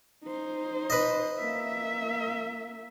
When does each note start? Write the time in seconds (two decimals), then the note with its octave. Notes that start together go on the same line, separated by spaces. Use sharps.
0.23 D#4 C5
0.90 B4 D#5
1.38 A#3 E5